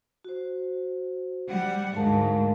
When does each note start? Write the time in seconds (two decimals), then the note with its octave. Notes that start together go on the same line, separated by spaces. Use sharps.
0.24 F#4 C5
1.48 G3 F#5
1.96 D2 G#2 A#4 F5 A5